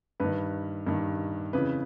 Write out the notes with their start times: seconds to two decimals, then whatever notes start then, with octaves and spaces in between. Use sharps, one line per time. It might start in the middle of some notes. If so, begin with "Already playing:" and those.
0.20 G2 D#3 B4
0.87 G2 D#3
1.53 F2 C#3 E3 B4